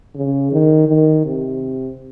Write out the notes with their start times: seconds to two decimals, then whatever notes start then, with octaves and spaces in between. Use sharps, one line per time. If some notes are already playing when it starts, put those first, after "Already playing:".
0.15 C#3
0.52 D#3
0.88 D#3
1.25 C3